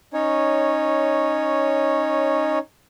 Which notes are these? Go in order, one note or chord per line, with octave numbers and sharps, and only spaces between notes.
C#4 D#4 C#5